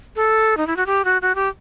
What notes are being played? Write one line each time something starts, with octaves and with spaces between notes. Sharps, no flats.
A4
D#4
E4
F#4
G4
F#4
F#4
G4